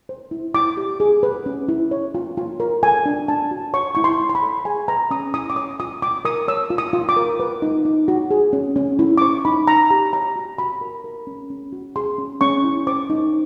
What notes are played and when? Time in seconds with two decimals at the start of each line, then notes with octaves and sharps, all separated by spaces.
0.09 C5
0.31 E4
0.55 E4 D6
0.77 G4
1.00 G#4
1.23 B4
1.46 C#4
1.69 E4
1.91 C#5
2.15 F4
2.37 F4
2.60 A#4
2.83 A4 G#5
3.06 D4
3.28 D4 A5
3.51 F#4
3.74 C#5 C#6
3.95 E4 C#6
4.04 C6
4.20 E4
4.29 C6
4.35 B5
4.42 A4
4.65 G#4 G#5
4.88 B4 A#5
5.11 C#4 D#6
5.34 E4 D#6
5.50 D6
5.56 C#5 D#6
5.80 F4 D#6
6.02 F4 D6
6.25 A#4 D#6
6.48 C#5 E6
6.70 F4
6.78 D#6
6.93 F4
7.09 D6
7.17 A#4
7.40 B4
7.62 D#4
7.85 D#4
8.08 F#4
8.31 G#4
8.53 C#4
8.76 C#4
8.99 E4
9.18 D6
9.21 C5 C#6
9.45 D#4 B5
9.67 D#4 A#5
9.90 G4 A#5
10.13 C#5 A#5
10.36 F#4
10.58 F#4 B5
10.81 A#4
11.04 A#4
11.27 C#4
11.50 C#4
11.73 F#4
11.96 G#4 C6
12.18 C#4
12.41 C#4 C#6
12.64 E4
12.87 C5 D6
13.10 D#4